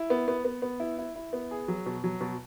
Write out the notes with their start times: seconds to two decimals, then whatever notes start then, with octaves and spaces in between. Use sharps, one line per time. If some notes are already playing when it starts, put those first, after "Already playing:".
Already playing: E4
0.10 B3
0.28 B3
0.45 B3
0.62 B3
0.80 E4
0.98 E4
1.16 E4
1.33 B3
1.51 G#4
1.68 F#3
1.86 B2
2.04 F#3
2.21 B2